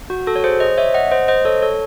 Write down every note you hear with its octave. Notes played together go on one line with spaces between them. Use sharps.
F#4
F#4 A4
C#5
G#4 C5
C5 D#5
C#5 E5
D#5 F#5
C5 D#5
C5 D#5
A4 C#5
A4 C#5